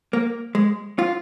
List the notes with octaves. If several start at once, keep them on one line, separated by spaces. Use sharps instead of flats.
A#3
G#3
F4